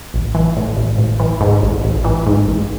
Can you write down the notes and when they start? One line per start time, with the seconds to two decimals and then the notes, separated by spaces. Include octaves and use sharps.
0.14 A1
0.34 E3
0.57 A2
0.77 A1
0.98 A1
1.20 E3
1.41 G#2
1.62 A1
1.84 A1
2.04 E3
2.26 G#2
2.47 A1